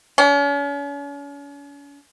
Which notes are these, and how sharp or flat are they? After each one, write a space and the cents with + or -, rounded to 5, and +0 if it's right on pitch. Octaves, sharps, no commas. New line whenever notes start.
C#4 +40